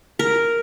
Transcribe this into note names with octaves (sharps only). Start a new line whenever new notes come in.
A#4